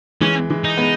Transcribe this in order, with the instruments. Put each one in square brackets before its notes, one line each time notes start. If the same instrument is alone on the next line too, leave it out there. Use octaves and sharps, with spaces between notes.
[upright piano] E3 G#3 [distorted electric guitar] C#4
[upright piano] E3 G#3
[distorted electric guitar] D#4
[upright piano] G#3 B3